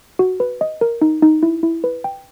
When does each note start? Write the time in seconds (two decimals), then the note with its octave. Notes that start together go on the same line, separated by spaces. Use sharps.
0.19 F#4
0.40 B4
0.61 D#5
0.81 A#4
1.02 D#4
1.23 D#4
1.43 E4
1.63 E4
1.84 B4
2.04 G5